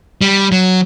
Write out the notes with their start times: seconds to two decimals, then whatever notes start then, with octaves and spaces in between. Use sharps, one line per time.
0.21 G3
0.52 F#3